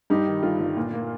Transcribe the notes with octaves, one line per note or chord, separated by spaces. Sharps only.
G2 D#4 G4
D#3
G1 F4
G1
A#2
A#3